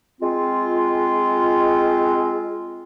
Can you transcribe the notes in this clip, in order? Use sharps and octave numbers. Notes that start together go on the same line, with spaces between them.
G#3 C4 F4